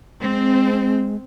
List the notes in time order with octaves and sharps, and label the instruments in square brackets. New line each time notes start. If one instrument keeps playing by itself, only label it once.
[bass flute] G#3 [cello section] C4